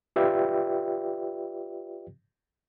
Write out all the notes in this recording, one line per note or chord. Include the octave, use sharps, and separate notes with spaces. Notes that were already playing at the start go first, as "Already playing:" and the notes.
F4 G4 B4 D5 E5 G5